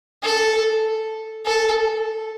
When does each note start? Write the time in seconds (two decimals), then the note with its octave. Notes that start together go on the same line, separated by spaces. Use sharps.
0.24 A4
1.46 A4